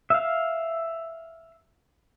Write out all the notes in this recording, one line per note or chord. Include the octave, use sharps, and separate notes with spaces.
E5 F5